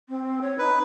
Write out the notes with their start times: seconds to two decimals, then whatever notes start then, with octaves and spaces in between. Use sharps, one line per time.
0.09 C4
0.42 C#5
0.59 D#4 B4